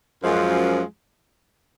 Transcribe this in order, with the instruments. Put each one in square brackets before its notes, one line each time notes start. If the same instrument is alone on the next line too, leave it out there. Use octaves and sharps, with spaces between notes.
[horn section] F#2 F3 G#3